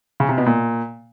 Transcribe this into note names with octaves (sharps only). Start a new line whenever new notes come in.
C#3
C3
B2
A#2